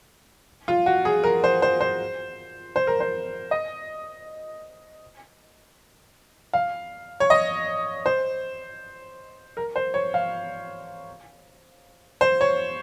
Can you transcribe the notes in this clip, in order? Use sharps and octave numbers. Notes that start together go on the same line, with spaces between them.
F4
F#4
G#4
A#4
C5
C5
C5
C5
A#4
C5
D#5
F5
C#5
D#5
C5
A#4
C5
C#5
F5
C5
C#5